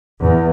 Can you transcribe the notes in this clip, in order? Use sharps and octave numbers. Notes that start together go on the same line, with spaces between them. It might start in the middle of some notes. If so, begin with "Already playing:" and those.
E2